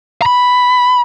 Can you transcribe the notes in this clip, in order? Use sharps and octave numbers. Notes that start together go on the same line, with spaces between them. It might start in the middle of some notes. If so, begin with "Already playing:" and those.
A#5 B5